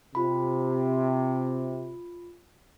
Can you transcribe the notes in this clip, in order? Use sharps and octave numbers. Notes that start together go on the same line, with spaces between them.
C3 F4 B5